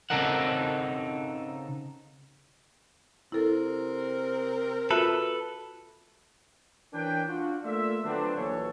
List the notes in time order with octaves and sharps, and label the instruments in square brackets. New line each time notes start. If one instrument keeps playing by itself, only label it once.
[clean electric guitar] C#3 C4 D#4 A4 A#4 F#5
[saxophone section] C3 C4 A#4 [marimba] E4 A4
[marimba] F4 F#4 E5 [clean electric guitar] A4 B4
[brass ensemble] E3 C#4 D4 A#4 B4 G5
D4 F4 F#4
A3 A#3 F4 D5 E5
D3 F3 F#3 B3 C4 D4
A#1 A#2 E3 F#3 A4 C#5